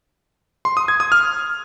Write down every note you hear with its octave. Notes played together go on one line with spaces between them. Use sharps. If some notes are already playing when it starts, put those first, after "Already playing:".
C6
D#6
G#6
D#6
F6